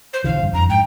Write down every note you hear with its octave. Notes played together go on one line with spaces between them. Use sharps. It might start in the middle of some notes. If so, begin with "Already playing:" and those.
C5
A#1 D3 E3 F5
G2 C3
F2 A#5
G#2 G5